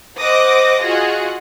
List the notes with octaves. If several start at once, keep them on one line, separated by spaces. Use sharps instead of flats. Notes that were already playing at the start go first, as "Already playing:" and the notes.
C5 D#5 F#5 D6 D#6 A#6
F4 F#4 G#4 D#5 F#5